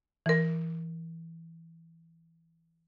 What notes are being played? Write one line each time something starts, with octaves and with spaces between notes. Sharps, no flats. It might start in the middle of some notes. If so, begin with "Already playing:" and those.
E3 A#4